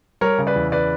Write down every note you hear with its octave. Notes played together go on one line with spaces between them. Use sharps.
G3 A#4 C#5
C#3
B4 D5
E2
C#3 B4 D5